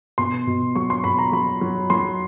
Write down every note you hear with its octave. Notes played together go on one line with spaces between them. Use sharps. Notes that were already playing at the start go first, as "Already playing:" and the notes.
B2 C6
B2
F#3 C#6
C6
B2 B5
A#5
F#3 B5
F#3
F#3 C6